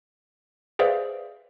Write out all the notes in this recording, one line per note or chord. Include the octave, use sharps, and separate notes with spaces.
G#4 B4 C5 D5 E5 F5